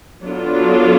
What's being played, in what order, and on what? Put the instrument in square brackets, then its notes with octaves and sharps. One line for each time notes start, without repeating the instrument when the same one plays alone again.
[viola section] F#3 B3 D4 F4 A4